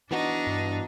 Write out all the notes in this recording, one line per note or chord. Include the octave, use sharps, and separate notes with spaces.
E3 B3 D4 D#4 F#4
G2